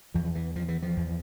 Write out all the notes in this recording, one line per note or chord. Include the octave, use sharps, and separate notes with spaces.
E2 F3
E3
E2 F3
E3
F3
E2